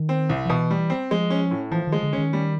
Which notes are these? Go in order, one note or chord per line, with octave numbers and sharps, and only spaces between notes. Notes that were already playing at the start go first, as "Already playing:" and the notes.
Already playing: D#3
C4
C2
F3
B2 E3
G3
C4
F3 G#3
C#4
A2
E3 F3
D#3
G#3
D3
D#3 C#4
G3